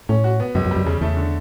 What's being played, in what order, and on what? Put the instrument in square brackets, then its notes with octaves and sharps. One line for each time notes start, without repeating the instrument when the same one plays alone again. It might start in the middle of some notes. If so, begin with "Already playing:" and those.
[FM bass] A2 [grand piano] C#4
[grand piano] F#4
B3
[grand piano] C#2 [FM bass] F#2
[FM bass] F#2
[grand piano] G3
[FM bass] F#2
[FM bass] E2 [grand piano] C#3
[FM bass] E2 [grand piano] A3
[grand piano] D3